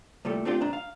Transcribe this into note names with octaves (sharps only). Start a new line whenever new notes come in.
C2 A#2 G3 A3
A3 C4 D4 F4 G4
C2 G#2 D4 A#5
F5